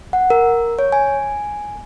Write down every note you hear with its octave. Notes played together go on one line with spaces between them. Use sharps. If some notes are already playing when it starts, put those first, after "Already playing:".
F#5
A#4
C#5
G#5